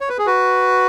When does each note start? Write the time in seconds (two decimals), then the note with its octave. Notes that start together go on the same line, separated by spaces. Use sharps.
0.01 C#5
0.09 B4
0.18 G#4
0.26 F#4 B4